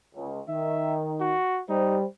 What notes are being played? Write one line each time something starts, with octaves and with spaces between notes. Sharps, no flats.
C#2
D#3 E5
F#4
G3 D#4 C5